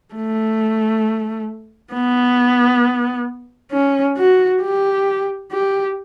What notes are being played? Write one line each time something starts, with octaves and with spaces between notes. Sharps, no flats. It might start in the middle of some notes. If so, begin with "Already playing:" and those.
A3
B3
C#4
F#4
G4
G4